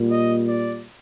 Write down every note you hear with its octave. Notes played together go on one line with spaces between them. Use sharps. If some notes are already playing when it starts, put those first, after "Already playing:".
Already playing: A#2 G3
D#5
D5